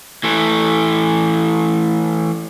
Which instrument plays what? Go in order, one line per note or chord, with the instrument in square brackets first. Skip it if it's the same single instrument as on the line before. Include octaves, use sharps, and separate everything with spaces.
[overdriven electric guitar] E3 A3